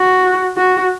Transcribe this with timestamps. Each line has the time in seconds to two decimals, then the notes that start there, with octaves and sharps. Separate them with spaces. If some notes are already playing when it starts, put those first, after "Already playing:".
Already playing: F#4
0.57 F#4